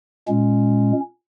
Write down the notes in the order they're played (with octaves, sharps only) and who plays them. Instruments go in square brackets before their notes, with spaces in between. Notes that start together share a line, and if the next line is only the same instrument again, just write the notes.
[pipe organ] A#2 G#3 C#4